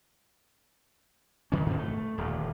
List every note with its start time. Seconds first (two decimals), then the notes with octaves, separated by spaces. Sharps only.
1.52 D#3 C#4
1.66 G#2 B2
1.78 A3
2.18 D#1 D2